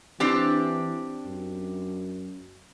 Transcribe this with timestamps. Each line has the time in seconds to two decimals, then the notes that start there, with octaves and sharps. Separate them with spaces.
0.20 E3 C4 D4 G4
1.26 F#2